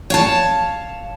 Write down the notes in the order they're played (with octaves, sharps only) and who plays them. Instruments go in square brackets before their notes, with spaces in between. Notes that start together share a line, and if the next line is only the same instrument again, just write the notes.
[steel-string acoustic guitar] C#5 F5 A5